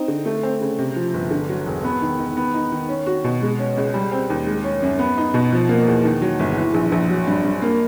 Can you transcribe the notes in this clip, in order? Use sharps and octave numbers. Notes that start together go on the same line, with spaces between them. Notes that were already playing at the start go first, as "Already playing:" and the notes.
Already playing: C4 D#4
D3
A3
C4
C#3
C3
F3
G1
D3
F#3
E1
B3
D#3
D#3
B3
D#4
D#3
C#4
F#4
B2
G#3
C#4
C#2
G3
C4
D#2
G#3
C#4
F#2
B3
D#4
B2
F3
A#3
E2
D#3
F#3
G1
E3
A#1
A#1
F#3
G2
G2
A#3